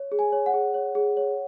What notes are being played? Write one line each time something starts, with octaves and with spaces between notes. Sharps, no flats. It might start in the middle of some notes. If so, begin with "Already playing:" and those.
Already playing: C#5
G#4
G#5
C#5
F#5
G#4
C#5
G#4
C#5